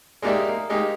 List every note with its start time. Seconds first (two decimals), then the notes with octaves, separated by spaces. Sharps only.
0.22 G#3 A#3 D#4 G4 D5 E5
0.48 A#3
0.70 G#3 A#3 D#4 G4